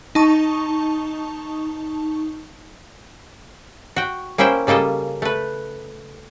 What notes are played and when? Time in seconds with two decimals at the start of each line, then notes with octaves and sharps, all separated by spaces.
0.15 D#4 A5 C#6
3.96 F#4 G5
4.38 A#3 C#4 E4 C5 E5 G5
4.67 C#3 G3 A#3 A4 D#5
5.22 A3 B4